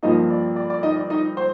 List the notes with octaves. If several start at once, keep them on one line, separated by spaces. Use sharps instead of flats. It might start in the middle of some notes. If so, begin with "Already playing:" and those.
G2 F3 A#3 D#4 D#5
D5
D5
D5
D#4 D#5
D5
D#4 D#5
C5